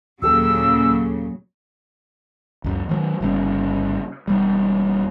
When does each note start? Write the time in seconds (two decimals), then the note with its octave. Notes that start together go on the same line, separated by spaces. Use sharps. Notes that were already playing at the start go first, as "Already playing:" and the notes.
0.22 D#2 A#2 C#3 F#3 G4 A4 E6
2.64 C#2 F#2
2.89 D#3 E3 F#3
3.20 G1 G2 C#3
4.28 E1 G3